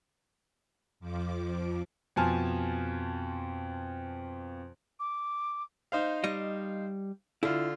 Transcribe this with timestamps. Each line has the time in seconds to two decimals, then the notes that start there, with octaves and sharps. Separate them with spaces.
1.00 F2 F3 D6
2.16 F2 B2 F3 G#5 A5 F6
5.00 D6
5.92 D#4 C5 F5
6.24 G3 D#5
7.43 D3 E4 F4